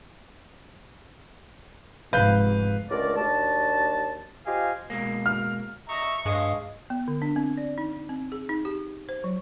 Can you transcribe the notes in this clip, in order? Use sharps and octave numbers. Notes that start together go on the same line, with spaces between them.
F1 G#2 B4 F5 G6
C#2 D3 A3 A#4 D5
D#2 D4 F#4 A5
F4 G4 C5 D#5 F5 G#5
B2 G#3 A#3
F6
D#5 E5 A#5 C#6
G2 G#3 D#5 F5
B3
D3
D4
C4
D5
D#4
C4
G#4
D#4
G4
C5
F#3